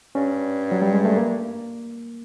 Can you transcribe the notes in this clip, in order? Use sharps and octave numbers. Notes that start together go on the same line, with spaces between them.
G2 C#4
F#3
G3
G#3
A3
A#3